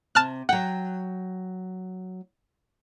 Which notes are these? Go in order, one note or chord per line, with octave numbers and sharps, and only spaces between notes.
C3 A5 F6 F#6
F#3 F#5 G5